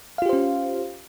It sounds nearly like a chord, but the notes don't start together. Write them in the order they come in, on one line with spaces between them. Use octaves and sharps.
F5 F4 G4 C5 C#4